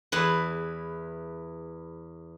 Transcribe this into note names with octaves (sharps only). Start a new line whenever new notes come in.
E2 E4 B4